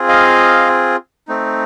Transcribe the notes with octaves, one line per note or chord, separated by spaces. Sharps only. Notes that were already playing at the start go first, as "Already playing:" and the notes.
Already playing: C4 F4 G#4
D#5 F5
A3 C4 D#4